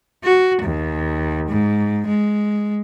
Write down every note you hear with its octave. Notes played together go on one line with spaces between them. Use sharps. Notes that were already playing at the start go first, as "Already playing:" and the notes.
F#4
D#2
G#2
G#3